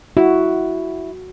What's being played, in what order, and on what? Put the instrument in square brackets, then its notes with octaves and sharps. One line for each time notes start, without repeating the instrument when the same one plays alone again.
[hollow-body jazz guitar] E4 [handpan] F#4